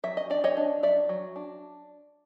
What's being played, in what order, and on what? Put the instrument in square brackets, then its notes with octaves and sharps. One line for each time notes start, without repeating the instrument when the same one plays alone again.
[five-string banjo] F#3 E5
D#5
D4 D5
C#5 D#5
D4
F#3 D5 E5
F#3
D4